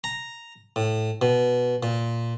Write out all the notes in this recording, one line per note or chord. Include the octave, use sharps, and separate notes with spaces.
A#5
A2
B2
A#2